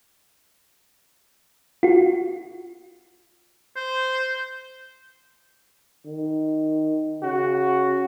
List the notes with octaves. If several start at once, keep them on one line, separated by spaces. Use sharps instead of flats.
F4 F#4
C5
D#3
C#3 F#4